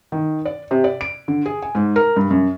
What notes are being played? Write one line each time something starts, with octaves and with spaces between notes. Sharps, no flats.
D#3
D5
C3
D5
D7
D3
G#4
G#5
G#2
A#4
G2
F#2